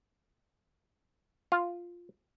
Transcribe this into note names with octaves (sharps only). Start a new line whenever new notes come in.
F4